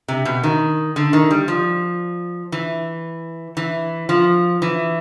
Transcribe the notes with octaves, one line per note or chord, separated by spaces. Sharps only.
C3
B2
D#3
D3
D#3
G3
F3
E3
E3
F3
E3